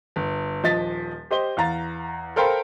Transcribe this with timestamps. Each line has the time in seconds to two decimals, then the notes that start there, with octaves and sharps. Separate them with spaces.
0.16 G1
0.63 D#1 F3 D#5 A6 B6
1.31 G4 C5 D#5 G7
1.57 E2 F5 A#5 A6
2.36 A4 A#4 C5 F5 G5 B5